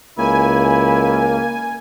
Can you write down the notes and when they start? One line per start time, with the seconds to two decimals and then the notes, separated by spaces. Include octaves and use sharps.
0.18 C#2 A#3 E4 G#5